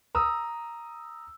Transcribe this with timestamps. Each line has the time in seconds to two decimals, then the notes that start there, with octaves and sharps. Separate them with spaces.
0.15 A#5 D#6 E6